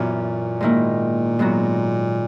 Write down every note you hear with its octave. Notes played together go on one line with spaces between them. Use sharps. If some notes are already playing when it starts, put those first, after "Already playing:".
Already playing: F#2 A#2 E3 B3
G#2 D#3 A#3 E4
G#2 F#3 B3 F#4